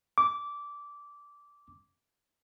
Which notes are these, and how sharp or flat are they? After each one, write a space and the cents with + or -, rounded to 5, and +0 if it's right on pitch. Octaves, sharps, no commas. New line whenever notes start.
D6 -15